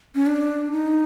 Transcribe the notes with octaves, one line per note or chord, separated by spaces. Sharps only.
C#4
D4
D#4